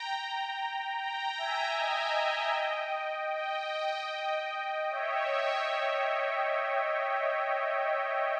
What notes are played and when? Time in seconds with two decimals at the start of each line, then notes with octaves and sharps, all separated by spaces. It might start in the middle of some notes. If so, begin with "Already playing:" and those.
Already playing: G5 A#5
0.99 G5 A#5
1.38 E5 G#5
1.77 D#5 G5
3.33 D#5 G5
4.90 C#5 E5